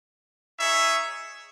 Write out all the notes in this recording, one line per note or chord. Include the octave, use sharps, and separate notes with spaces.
D#4 G#4 C#5 E5